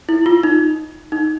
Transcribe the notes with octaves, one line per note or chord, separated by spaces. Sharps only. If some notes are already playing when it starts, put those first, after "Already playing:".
E4
F4
D#4
D#4